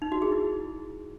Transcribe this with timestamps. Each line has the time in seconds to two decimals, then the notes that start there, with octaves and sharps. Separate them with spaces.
0.02 D#4
0.12 F#4
0.22 G#4
0.32 E4